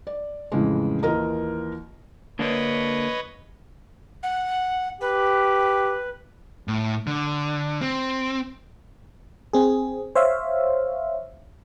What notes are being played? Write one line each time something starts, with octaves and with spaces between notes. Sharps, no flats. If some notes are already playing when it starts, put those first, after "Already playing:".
D5
F2 A2 C#3 E3 G#3
D#2 E3 F4 A#4 D#5 A#5
D3 A#3 D4 B4 C#5 D#5
F#5
G4 B4
A2
D3
C4
C4 G#4
C5 C#5 E5 F5